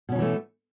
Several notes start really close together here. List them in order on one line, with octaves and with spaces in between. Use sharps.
B2 C#4 F#3 E3 A3